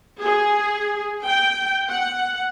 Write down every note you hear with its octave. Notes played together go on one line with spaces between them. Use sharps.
G#4
G5
F#5